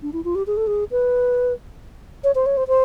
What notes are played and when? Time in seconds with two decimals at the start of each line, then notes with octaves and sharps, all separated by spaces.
0.02 D4
0.13 E4
0.24 F4
0.35 G4
0.47 G#4
0.57 A4
0.67 G#4
0.91 B4
2.24 C#5
2.35 C5
2.46 C#5
2.57 C5
2.68 C5